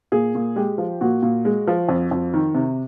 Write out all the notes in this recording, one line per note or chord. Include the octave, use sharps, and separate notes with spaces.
A#2 G#4
A#2
G#3 G4
F3
A#2 F#4
A#2
G#3
F3
F2
F2
D#3
C3